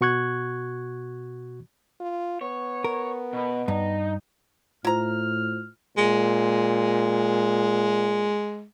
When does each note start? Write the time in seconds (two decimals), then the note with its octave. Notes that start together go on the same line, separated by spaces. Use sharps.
0.01 B2 F#4 C#6 F#6 G#6
2.00 F4
2.41 B3 C#5
2.84 A#4
3.33 B2 B4
3.68 G2 D#4
4.85 A2 E4 F4 C5 A#5 F6
5.97 A#2 G#3